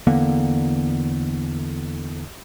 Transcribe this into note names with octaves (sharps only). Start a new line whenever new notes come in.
E2 D3 A#3 B3